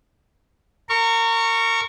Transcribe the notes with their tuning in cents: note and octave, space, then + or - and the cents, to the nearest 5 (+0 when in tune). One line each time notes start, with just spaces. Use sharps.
A#4 -30 C#6 +0